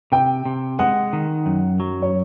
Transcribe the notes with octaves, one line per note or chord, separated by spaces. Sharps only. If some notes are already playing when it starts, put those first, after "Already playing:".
C3 G5
C3
G#3 F#5
D#3
F#2
F#3
C#5